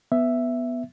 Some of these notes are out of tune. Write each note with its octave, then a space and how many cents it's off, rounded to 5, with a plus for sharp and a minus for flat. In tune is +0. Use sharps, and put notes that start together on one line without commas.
B3 +0 E5 +5